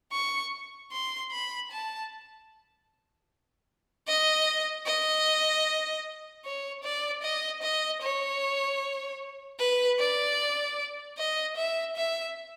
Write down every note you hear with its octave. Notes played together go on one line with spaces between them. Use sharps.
C#6
C6
B5
A5
D#5
D#5
C#5
D5
D#5
D#5
C#5
B4
D5
D#5
E5
E5